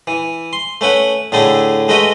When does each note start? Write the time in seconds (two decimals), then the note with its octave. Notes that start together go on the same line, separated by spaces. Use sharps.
0.07 E3
0.53 C6
0.81 A3 C#4 B4 F#5
1.32 A2 D3 A3 E4 G#4
1.88 G#3 A3 F#4 B4 D#5